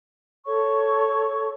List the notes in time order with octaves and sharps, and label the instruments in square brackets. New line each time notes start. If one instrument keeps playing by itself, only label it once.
[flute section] A4 C#5 C#6